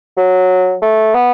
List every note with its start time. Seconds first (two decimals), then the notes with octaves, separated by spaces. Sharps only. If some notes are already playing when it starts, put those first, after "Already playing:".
0.17 F#3
0.82 A3
1.15 B3